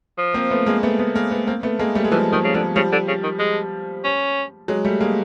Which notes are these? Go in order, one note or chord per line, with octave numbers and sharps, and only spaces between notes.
F3
A#3 C4
A3 B3
G#3 A#3
A3 B3
A3 B3
G#3 A#3
A3 B3
A#3 C4
A3 B3
G#3 A#3
G3 A3
G#3
E3 F3 G3
D#3 F3
C#3
D3 F3
C#3 F3 G3
D3
C#3
D#3
G#3
C#4
F#3 G#3
G3 A3
G#3 A#3